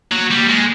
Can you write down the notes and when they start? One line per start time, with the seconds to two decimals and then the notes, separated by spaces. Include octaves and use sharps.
0.12 F#3 A#3
0.31 G3
0.49 G#3